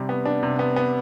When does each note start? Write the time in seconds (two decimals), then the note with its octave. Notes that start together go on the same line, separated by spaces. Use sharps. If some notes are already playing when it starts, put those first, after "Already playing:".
Already playing: C3 G3
0.09 B3
0.26 D4
0.43 C3
0.59 B3
0.76 B3